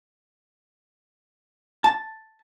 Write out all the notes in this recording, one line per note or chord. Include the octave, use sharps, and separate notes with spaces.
A5